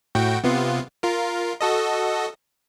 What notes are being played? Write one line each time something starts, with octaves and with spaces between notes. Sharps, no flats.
A2 F#4 G5
C3 B3 F4
F4 A#4
F#4 A4 D#5